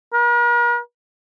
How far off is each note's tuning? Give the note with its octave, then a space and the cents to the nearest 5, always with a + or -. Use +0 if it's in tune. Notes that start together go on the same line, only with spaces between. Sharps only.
A#4 +45